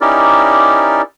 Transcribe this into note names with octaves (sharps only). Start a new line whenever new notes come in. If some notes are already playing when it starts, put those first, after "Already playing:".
C#4 D#4 E4 G4 A#4 D5